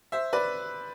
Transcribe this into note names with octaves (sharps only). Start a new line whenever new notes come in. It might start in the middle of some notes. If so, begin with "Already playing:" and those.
C5 E5
B4 D5